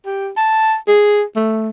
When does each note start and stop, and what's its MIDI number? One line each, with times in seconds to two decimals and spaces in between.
0.06 0.29 67
0.37 0.75 81
0.88 1.23 68
1.36 1.70 57